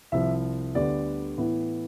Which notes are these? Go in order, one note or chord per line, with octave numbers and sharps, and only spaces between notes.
C2 C3 F3 E5
D2 D3 G3 B3 D5
A2 E3 B3